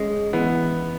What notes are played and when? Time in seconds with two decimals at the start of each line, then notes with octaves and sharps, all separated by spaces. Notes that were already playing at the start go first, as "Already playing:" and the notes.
Already playing: G#3 C#4
0.33 E3 B3